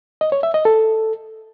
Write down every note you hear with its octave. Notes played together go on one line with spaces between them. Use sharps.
D#5
C#5
E5
D#5
A4